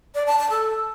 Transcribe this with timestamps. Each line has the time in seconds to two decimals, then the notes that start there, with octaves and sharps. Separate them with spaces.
0.15 D5
0.27 A5
0.39 A5
0.50 A4